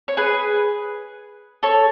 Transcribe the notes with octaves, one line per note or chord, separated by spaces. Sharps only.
C#5
G#4 B4
A4 C#5